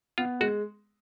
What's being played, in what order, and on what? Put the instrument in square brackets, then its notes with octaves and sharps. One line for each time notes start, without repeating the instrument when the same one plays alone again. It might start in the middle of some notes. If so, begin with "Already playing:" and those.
[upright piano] B3 [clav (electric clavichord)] F4
[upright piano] G#3 [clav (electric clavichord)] F#4